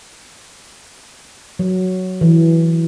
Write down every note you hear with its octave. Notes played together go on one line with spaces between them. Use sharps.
F#3
E3